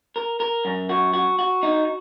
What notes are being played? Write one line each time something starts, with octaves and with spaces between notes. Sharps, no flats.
A#4
A#4
F#2
F#4
F#4
F#4
D#4